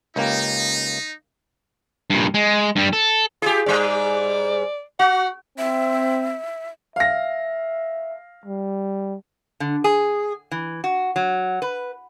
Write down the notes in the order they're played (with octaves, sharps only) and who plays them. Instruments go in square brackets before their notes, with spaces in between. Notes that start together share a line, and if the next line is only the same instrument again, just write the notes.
[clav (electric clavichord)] C#2 A#3 G4 [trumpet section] D#4
[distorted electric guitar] G2 A#2
G#3
G2 G3
A4
[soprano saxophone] F4 [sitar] G4 G#4
[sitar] G#2 G3 [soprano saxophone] D5
[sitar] F#4 [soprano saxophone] F#5
[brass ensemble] C4 [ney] E5
[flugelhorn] E5 [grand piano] F5 A#6
[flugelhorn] G3
[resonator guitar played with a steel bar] D3
G#4
E3
F#4
F#3
B4